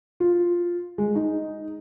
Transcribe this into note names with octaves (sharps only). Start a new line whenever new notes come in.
F4
G#3
D#4